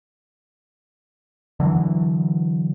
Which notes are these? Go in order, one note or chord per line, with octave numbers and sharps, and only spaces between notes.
D3 E3 F#3